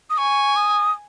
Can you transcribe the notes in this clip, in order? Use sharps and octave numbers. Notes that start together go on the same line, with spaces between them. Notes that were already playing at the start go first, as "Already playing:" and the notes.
D#6
G#5 C#6
D#6